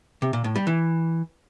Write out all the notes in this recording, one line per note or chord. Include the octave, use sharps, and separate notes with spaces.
C3
A#2
A2
G3
E3